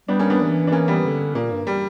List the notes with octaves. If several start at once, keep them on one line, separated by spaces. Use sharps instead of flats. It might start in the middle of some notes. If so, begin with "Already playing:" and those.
G3 B3 D4
A#3 C#4
B3 D4
E3
D4
A#3 C#4
G3 B3
D3
A#2 A#3
G2
G3